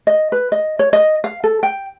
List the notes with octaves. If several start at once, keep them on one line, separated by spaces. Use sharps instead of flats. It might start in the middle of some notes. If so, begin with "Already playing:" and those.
D#5
B4
D#5
C#5
D#5
F5
A4
G5